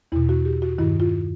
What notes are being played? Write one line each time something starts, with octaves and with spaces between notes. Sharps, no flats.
E2 B2 E4
F#4
G4
F#4
G2 D#3 E4
F4